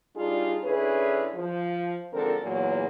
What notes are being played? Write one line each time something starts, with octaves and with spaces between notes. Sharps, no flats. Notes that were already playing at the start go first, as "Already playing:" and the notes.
G3 D4 D#4 F4 G#4
D3 C#4 E4 G#4 B4
F3
G#2 D3 F3 C4 A4 A#4
E2 A#2 F#3